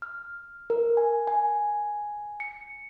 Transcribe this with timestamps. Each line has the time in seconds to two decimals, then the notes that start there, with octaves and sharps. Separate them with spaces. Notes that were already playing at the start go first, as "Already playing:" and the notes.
0.02 F6
0.70 A#4
0.97 G#5
1.27 G#5
2.40 C#7